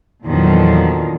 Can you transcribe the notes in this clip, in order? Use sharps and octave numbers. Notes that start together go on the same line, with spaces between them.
E2 A#2 D3 D#3 F3 F#3